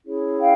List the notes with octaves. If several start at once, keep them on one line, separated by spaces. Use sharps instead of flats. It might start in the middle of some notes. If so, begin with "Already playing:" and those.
C#4 E4 G#4 C#5
F5 G5